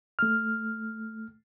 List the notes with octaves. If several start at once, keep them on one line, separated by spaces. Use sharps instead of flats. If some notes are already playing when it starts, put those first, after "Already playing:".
A3 F6